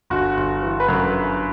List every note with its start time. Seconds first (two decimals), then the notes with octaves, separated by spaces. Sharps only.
0.10 G1 F#4
0.37 G1
0.63 E3
0.80 B4
0.89 F#2